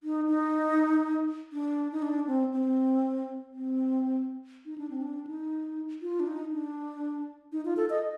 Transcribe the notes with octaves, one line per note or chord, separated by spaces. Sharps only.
D#4
D#4
D4
D#4
D4
C4
C4
C4
D#4
D4
C4
D4
D#4
F4
D4
D#4
D4
D#4
F4
A4
D#5